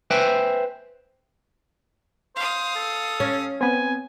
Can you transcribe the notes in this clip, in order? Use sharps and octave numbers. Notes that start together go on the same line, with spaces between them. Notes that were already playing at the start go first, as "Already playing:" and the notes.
B4 C5 E5 G5 G#5
C5 F5 D#6
A4
C#4
B3 C4 G#5